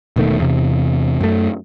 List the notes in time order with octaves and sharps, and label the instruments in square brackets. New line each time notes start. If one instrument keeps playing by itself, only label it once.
[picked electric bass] E1 B2 D#3 A3
E2 C3
F#2 A3